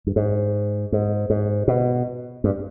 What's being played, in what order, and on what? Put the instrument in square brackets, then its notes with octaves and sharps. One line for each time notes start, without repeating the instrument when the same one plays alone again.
[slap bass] G2
G#2
G#2
G#2
B2
G2